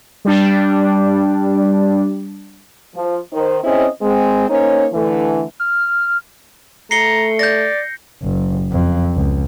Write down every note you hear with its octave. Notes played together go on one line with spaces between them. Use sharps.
G3 D4
F3
D#3 C5
C4 C#4 E4 G#4 C5 D#5
G#3 C4
A#3 C#4 D#4 C5 C#5
D3 E3 A3
F6
A3 A#5 C7 C#7 G7
D5 G6 A#6
F#1
F2
C#2